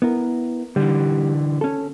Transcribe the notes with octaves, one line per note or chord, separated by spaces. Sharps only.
B3 E4 A#4
D3 E3 G3
C#4 A4